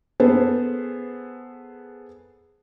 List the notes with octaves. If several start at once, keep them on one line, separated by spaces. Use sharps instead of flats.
B3 G#4 A4 B4 C5